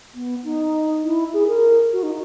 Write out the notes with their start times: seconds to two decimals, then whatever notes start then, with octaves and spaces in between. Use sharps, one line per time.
0.14 B3
0.44 D#4
1.04 E4
1.34 G#4
1.48 A#4
1.93 F#4
2.03 D#4